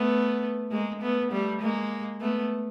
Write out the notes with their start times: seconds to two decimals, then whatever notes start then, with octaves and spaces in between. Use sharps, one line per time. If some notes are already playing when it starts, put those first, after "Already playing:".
Already playing: A3 B3
0.71 G#3 A#3
1.01 A3 B3
1.31 G3 A3
1.61 G#3 A#3
2.21 A3 B3